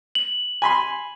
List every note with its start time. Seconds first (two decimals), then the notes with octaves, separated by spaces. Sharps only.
0.15 F#7
0.62 G#5 B5 C6